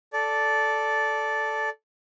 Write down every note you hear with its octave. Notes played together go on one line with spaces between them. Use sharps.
A4 D5